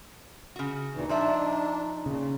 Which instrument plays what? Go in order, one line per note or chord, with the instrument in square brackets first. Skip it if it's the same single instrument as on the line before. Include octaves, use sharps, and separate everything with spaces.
[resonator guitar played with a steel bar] C#3 F#4
[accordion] D2 A#2 E3 [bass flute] D#4
[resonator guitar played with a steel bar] F3 D5 E5 [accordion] D4
[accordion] A#2 [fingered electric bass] C#3